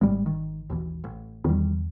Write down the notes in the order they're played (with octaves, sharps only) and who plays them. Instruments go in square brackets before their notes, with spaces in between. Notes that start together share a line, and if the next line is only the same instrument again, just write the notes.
[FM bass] G#1 [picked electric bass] A2 G3 G#3
[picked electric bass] D#3
D#2 B2 E3
A1
[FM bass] E2 [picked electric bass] D#3 G3